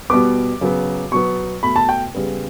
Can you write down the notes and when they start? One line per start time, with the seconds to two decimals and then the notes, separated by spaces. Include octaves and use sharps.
0.10 B2 G3 B3 D6
0.61 C#3 F#3 B3
1.11 B2 F#3 B3 C#6
1.63 B2 A3 B5
1.76 A5
1.89 G5
2.14 C#3 G3 B3